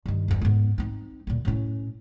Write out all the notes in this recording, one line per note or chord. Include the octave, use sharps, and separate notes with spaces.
G2 D#3
G1 E2
G#2 B3
C4 D#4
D2 A#2
A2 C#4